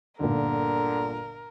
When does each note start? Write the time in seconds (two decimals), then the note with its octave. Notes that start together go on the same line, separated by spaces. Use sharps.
0.20 G1 A#2 D3 A#4